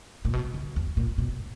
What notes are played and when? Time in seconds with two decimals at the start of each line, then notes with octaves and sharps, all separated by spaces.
0.25 A#2
0.33 B2
0.54 C#3
0.76 E2
0.97 A#2
1.18 B2